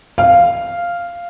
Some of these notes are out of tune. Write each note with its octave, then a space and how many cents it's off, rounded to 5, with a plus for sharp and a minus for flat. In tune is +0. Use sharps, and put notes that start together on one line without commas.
F5 -5